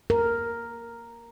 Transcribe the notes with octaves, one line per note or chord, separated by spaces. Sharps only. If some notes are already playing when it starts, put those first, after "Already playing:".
A#4